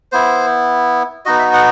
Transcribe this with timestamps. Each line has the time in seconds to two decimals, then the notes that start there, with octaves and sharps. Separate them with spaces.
0.12 B3 E4 C5
1.25 B3 D#4 F#4 D#5
1.39 E5
1.53 F#5